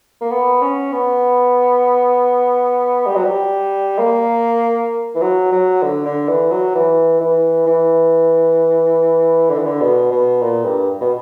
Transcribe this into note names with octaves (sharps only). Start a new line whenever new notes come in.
A#3
B3
C#4
B3
G3
F#3
G3
A#3
E3
F#3
F#3
D3
D3
E3
F#3
E3
E3
E3
D3
E3
D3
B2
B2
A#2
G2
B2